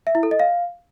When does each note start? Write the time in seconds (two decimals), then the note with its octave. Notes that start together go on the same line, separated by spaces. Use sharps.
0.07 E5
0.15 E4
0.23 A4
0.31 D#5
0.40 F5